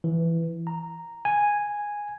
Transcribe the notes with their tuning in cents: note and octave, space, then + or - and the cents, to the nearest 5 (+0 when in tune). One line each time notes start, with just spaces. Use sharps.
E3 +10
A#5 -5
G#5 -5